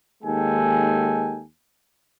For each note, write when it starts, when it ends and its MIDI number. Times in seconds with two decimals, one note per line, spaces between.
0.23 1.42 39
0.23 1.42 56
0.23 1.42 63
0.23 1.42 69
0.23 1.42 79
0.23 1.42 80